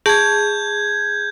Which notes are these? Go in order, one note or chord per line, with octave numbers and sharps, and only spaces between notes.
G#4 A5 G6 G#6